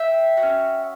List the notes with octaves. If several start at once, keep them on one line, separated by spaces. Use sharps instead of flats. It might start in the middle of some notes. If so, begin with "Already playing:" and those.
Already playing: E5 G5
F#4
C#4